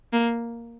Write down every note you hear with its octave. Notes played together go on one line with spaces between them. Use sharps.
A#3